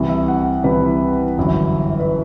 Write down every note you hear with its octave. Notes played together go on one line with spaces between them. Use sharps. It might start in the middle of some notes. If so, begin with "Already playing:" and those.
Already playing: C2 C3 E3
E5
F#5
C2 C3 E3 B4
G1 F#2 E3
B4